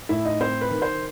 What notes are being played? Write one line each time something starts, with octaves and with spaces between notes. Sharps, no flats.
A2 E4 E5
D#4 D#5
C4 C5
B4
D#3
C5